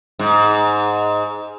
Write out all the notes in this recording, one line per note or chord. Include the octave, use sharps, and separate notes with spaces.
G#2